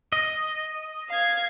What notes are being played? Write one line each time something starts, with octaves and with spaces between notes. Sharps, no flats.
D#5
F5 G#6